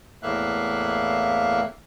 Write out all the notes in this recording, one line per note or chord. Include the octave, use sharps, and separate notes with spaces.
E2 A2 A#3 E5 F5 F#6